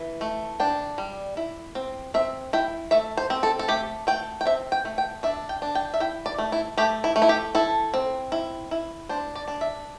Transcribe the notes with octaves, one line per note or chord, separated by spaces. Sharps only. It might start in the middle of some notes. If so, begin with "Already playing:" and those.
Already playing: E3
A3
D4 G5
G3
E4
C4
C4 E5
E4 G5
A3 E5
C5
C4
A4
A4
A3 G4
A3 G5
G5
C4 E5
G5
A3
G5
D4 E5
G5
D4
G5
E5
E4 G5
D5
A3
E4
A3 G4
E4
A3
E4
G4
E4 A4
C4
E4
E4
D4 C5
D5
D4
E5